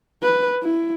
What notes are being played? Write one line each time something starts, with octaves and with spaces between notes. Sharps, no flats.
B4
E4